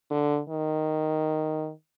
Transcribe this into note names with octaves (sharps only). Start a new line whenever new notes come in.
D3
D#3